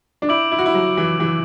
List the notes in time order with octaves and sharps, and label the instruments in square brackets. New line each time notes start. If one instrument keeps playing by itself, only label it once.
[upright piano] D4
[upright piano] E4 [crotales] D6 G6 D7 F#7
[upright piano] E4
F#4
E4
F#3
E3
E3